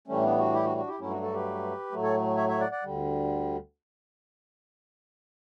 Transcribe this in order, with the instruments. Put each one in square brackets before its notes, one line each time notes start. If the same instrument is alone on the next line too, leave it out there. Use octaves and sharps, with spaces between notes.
[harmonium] A2 E3 G3 A3 C#4
B3 D4
D4 F#4
E4 G4
D4 F#4
D4 F#4
E4 G4
G2 F#3 A3 C#4 E4
D4 F#4
F#4 A4
G4 B4
A2 F#3 A3
A4 C#5
C#5 E5
C#5 E5
D5 F#5
D5 F#5
D2 D3 G3